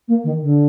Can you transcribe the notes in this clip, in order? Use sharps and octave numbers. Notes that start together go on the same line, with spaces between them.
A#3
D#3
D3